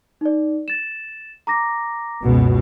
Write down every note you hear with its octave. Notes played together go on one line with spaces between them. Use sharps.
D#4 D5
A6 E7
A#5 D6 A#6
F#1 C#2 B2